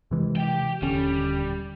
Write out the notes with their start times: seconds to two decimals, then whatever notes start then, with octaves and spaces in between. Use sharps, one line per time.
0.11 C3 E3 G#3
0.36 G4 G5
0.82 D#1 D3 G3 C#4